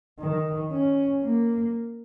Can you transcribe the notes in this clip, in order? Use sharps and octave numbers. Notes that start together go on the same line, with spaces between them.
D#3
C#4
A#3